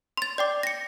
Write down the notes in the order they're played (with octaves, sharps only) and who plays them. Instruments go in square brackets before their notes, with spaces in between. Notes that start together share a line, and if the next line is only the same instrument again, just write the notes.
[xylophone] C6 A6
D5 G5 D6
A#6 C#7